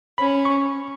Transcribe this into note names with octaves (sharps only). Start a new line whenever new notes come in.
C#4 B5
C#6